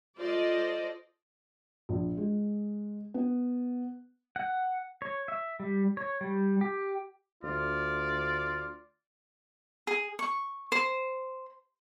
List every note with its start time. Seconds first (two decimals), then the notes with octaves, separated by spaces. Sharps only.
0.19 F4 A4 C5 D5 D#5
1.89 A#1
2.17 G#3
3.14 B3
4.36 F#5
5.02 C#5
5.28 E5
5.60 G3
5.97 C#5
6.21 G3
6.61 G4
7.43 D2 F4 D5
9.87 G#4
10.19 C#6
10.72 C5